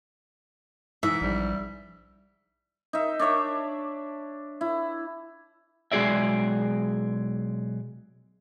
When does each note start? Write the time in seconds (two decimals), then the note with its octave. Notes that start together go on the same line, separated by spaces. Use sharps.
1.03 G#2 E3 E5
1.22 A#1 G3
2.93 D#4 E5
3.19 D4 C#5 E5 D6
4.61 E4
5.92 B1 G#3 F#4 G#4 D5 E5